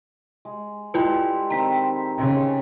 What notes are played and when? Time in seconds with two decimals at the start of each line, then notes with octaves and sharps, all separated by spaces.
0.45 G#3
0.94 G3 G#3 E4 F4 A4 B4
1.50 D#3 C4 A#5 B6
2.18 C#3